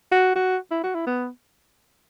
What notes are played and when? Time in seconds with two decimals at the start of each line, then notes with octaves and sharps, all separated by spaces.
0.12 F#4
0.35 F#4
0.71 E4
0.83 F#4
0.95 E4
1.07 B3